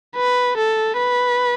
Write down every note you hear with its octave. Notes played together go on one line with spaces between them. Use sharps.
B4
A4
B4